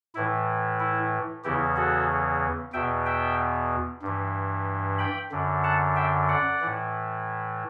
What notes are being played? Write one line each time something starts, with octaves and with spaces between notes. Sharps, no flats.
A2 E3 E4
E4
E2 C#3 E3 E4 G4
F#4 A4
E2 B2 E5 G5
E5 G5
G2 E3
G5 B5
F#2 D3
F#5 A5
E5 G5
D5 F#5
A2 E3